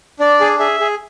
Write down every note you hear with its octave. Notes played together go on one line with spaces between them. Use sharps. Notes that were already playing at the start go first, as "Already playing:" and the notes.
D4 D5
G#4
G#4 E5
G#4